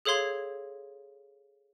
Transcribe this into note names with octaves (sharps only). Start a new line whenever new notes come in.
G#4 A4 C#5 F5 C6 G#6